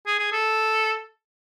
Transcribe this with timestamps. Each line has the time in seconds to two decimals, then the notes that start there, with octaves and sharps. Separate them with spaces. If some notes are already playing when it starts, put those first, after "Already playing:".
0.07 G#4
0.19 G#4
0.32 A4